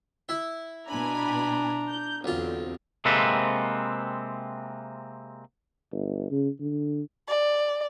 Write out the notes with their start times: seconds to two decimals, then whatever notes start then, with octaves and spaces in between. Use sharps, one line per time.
0.29 E4 E5
0.88 B2 D4 G#5 A#5 B5
1.89 G6
2.24 B1 E2 D3 C4 F4
3.05 C3 G#3 A#3 C4 A4 B4
5.91 G1
6.31 C#3
6.60 D3
7.28 D5